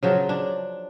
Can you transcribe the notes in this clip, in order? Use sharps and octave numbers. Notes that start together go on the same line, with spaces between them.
C#3 F3 F#3
D4